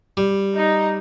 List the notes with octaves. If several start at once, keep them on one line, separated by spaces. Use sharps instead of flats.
G3
D#4